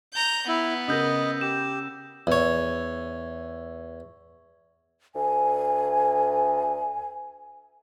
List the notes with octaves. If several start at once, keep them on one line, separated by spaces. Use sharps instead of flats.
A#5 G6
B3 E4
C#3 A#4 D#5 E6 G6 A#6
G4 E7
E2 C#5
D2 G#5